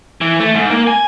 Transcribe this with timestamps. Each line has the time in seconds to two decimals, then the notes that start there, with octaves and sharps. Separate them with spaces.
0.21 E3
0.40 A3
0.55 G#2
0.70 A#3
0.87 G#5